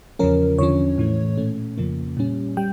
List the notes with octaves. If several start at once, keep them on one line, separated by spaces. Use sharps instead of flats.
E2 C#3 F3 C#4 A#4
E2 D3 F3 C#4 C#5
A2 E3 A3
A#2 A3 C#4
F2 C#3 F3 A#3
A#2 G3 C#4
G3 G5